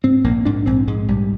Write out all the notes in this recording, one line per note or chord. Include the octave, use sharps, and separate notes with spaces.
G#2 C4
A#1 A#3
G#2 D4
A#1 C4
G#2 G#3
A#1 G3